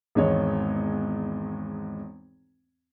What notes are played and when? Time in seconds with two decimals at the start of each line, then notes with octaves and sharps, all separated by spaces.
0.15 G#1 E2 G#3 C#5